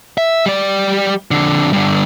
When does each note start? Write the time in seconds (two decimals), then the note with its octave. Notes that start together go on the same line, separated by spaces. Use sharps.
0.18 E5
0.46 G3 D5
1.31 F2 D3
1.73 G2 D3